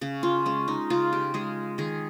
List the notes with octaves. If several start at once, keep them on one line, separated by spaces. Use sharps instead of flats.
C#3 C#4
F4
G#3 C#4
D#4
C#3 F4
G4
G#3 G#4
D#3 G#4